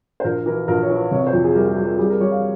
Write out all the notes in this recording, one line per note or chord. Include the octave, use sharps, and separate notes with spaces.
C5
A#1 A#4
E3 A#4
A#1 A#4
C#5
E3
C3 C#5
C5
F2
G#4
G3 A#4
G#4
G3
A#4
G3 G#4
A#4
G3 C#5
F5